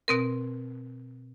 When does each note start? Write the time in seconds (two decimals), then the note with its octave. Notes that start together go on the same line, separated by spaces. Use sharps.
0.08 B2 C4 A#4